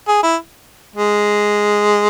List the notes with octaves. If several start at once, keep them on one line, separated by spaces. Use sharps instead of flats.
G#4
E4
G#3